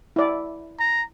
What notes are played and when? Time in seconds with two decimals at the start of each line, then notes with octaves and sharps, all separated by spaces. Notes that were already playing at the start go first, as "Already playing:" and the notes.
0.16 E4 D5
0.80 A#5